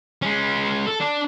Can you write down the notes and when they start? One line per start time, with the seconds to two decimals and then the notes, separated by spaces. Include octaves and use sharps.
0.22 G#3 C#4
0.87 A4
1.00 D4